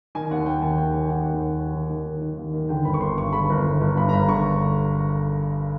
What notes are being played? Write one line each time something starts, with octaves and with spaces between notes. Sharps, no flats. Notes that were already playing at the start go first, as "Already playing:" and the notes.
D#3 G#5
D#2 F#5
D#3 G5
D#2 G#5
D#2 G5
D#3
G5
D#3 F#5
D#2
D#2
D#2
D#3
D#3
D#3
D#3
D#2
D#3
D3 G5
G1 B5
C#6
G1 C6
G2 C#6
D3 B5
G1
G1
G1
G2 B5
A#5
G1 B5
D3 C#6